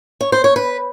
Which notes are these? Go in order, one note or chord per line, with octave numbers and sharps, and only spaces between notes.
C#5
C5
C#5
B4